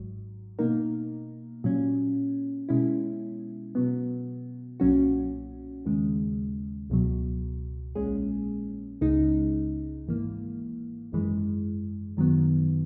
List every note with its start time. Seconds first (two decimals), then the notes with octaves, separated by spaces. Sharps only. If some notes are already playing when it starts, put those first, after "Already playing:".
Already playing: G#1 G#2 F#3
0.59 B2 A#3 D#4 A#4
1.64 A#2 F#3 C#4
2.69 B2 G#3 C#4 E4
3.75 B2 F#3 B3
4.80 B1 A#2 F#3 C#4 F#4
5.85 D#2 C#3 G#3
6.90 C#2 B2 F#3
7.95 A#1 A#2 G#3 C#4 G#4
9.01 C#2 C#3 G#3 D#4
10.07 G#1 G#2 E3 A#3
11.12 G#1 F#2 E3 G#3
12.17 F#2 D#3 F#3 B3